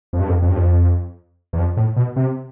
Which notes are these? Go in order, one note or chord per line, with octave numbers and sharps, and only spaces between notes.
F2
G2
F2
F2
G2
F2
E2
F2
A2
B2
C3